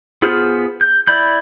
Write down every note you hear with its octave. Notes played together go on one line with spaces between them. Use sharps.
B3 F4 G#4 C5 F6
G6
E4 D5 B5 G6